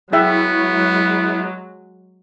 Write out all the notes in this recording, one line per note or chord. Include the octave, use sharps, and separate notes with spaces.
F#3 G#3 B3 E4 G#4 E5 G5